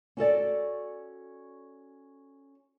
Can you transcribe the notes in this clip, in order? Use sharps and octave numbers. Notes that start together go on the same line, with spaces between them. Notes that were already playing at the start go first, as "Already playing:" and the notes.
C#4 F#4 A4 D5